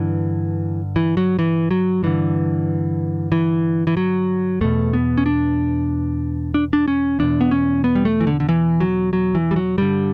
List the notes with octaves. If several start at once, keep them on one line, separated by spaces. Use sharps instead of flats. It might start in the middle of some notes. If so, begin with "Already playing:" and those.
Already playing: G2 D3 E3
E3
F#3
E3
F#3
G2 D3 E3
E3
E3
F#3
E2 B2 A3
B3
C#4
D4
D4
D4
C#4
E2 B2 D4
B3
C#4
B3
G3
A3
E3
D3
D3
E3
F#3
F#3
E3
G3
F#3
G2 D3 G3